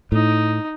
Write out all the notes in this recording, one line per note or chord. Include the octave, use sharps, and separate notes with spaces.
A2 D#4